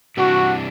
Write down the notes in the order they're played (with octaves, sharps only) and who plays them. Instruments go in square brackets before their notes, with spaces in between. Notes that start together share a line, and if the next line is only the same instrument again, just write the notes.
[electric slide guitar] C3 E3 G3 D4 [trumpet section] F#4